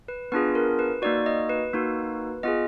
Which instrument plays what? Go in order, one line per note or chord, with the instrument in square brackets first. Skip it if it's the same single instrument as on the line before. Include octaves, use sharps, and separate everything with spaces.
[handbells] B4
B3 D4 F4 G#4 B4
A#4
B4
A#3 D#4 F#4 D5
D#5
B4
A#3 D#4 F#4
B3 F4 G#4 D#5